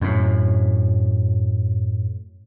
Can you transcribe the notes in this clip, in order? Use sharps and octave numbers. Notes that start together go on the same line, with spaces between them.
F#2 A2